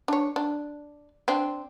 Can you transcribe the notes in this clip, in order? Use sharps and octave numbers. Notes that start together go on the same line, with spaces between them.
D4 C#5
D4
C4 D4